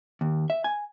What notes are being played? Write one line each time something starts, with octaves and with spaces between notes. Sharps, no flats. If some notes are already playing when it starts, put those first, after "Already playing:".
D#2
E5
G#5